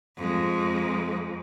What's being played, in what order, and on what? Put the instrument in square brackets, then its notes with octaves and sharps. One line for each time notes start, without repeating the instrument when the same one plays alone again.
[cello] F2 G#3